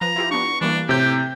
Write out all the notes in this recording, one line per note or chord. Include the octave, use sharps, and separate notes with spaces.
F3 B4 A#5
E4 F4 G4
B3 D4 C#6
E3 G3 A#3 D4
A2 C3 G4 G6